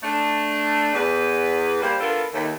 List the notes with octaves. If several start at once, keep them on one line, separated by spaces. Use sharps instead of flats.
A3 D4
E2 B4
G3 A#3 C5
B3 D4 E4 F4 A4 A#4
D#2 A3